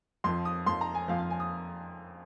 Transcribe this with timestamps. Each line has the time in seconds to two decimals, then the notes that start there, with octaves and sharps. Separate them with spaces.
0.24 F2 F3 C6
0.45 D#6
0.67 F2 F3 C6
0.81 A#5
0.95 G#5
1.08 F2 F3 F5
1.19 F5
1.30 G#5
1.40 D#6